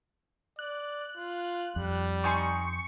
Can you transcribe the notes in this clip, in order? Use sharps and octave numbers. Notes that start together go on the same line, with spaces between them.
D5 F#6
F4
F2 G3
D#4 G#5 C6 C#6